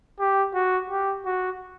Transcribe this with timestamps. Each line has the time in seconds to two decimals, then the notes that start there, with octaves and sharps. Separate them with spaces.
0.20 G4
0.54 F#4
0.90 G4
1.26 F#4